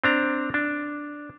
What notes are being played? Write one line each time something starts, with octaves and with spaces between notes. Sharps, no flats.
C4 D4 A#5
D4